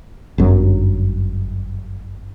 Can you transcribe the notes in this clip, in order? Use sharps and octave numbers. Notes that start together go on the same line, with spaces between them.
G1 F#2 F#3